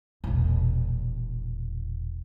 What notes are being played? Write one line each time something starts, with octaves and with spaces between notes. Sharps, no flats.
E1 A#1